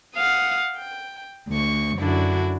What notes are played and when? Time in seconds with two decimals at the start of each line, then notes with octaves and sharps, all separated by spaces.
0.14 F5 F#5 D#6
0.77 G5
1.48 D2 C#6
1.98 F#2 D3 D4 E4 F#4